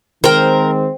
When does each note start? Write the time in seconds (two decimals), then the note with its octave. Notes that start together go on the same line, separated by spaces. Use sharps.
0.24 D#3 G#3 C4 A#4 C5 G5